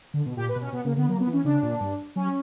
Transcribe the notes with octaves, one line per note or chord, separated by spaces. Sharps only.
D3
B2
A#2 G4
B4
B2
C#4
B2 B3
C#3 A#3
D3 B3
F#3 A#3
B3
E3
C#4
C#3 D4
A#2
G2
F#3 C#4